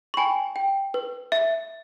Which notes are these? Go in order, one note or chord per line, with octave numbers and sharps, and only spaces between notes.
C#6
G5 G#5 B5
G5
B4
E5